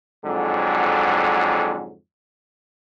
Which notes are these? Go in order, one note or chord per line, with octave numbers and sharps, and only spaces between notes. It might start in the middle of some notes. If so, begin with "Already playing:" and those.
F2 G#2 D3 F#3